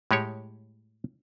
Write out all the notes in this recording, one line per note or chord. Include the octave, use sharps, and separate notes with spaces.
A2 G#3 G4 C#5